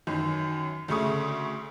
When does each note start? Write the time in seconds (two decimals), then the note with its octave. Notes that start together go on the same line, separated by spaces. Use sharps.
0.07 F#2 D#3 E3
0.88 D2 C#3 A3 C#6 D#6